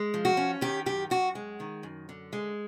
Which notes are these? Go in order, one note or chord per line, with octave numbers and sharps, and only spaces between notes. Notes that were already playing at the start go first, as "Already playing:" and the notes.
Already playing: G#3
F3
F#4
C#4
D#3 G4
F#2 G4
F#2 F#4
G#3
D#3
F#2
D3
G#3